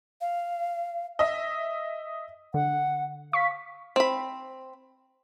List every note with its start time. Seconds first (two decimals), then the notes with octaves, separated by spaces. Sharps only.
0.21 F5
1.19 D#5 E5
2.54 D3 F#5
3.33 F5 C#6 B6
3.96 C4 B5